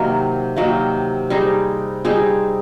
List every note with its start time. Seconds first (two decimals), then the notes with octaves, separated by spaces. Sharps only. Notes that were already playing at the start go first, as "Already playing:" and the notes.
Already playing: C3 D#3 F#3 A#3
0.56 C3 D#3 F#3 A#3
1.30 G3 C4 D#4 G#4
2.05 G3 C4 D#4 G#4